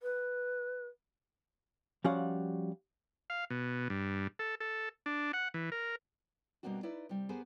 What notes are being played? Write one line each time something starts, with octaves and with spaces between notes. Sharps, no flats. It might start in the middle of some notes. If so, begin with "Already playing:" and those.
B4
F3 G3 C#4 F#4 F5 F#5
F5
B2
G2
A4
A4
D4
F#5
E3
A#4
B2 G3 A#3 C4 D4 F#4
D#4 E4 B4 D5
C3 G3
B3 G4 G#4 A#4 C5